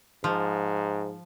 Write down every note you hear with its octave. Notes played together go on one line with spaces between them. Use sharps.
G#2 F3